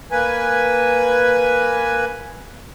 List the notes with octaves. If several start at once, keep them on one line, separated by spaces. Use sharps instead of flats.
A#3 B4 G#5